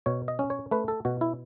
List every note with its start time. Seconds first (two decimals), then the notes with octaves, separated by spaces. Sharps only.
0.06 B2 C#5
0.28 D#5
0.39 C#4
0.50 C#5
0.71 A3 B4
0.88 A4
1.05 B2 F#4
1.21 E4